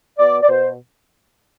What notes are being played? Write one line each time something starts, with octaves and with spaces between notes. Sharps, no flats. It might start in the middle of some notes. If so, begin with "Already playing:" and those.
B2 D5
D5
B2 C5